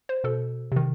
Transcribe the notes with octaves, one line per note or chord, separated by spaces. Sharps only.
C5
B2 A4
C3 D#3